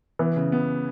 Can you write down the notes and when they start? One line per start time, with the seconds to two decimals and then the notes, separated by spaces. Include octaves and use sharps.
0.19 E3 B3
0.36 C#3
0.52 B3